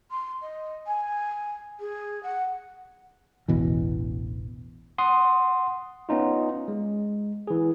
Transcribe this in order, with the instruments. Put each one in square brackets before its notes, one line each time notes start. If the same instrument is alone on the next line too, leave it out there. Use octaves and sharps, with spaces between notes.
[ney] C6
D#5
G#5
G#4
F#5
[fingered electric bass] E1 A1 B2 E3
[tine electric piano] F#5 C6 D#6
B3 C#4 D#4 F4
G#3
E3 G#4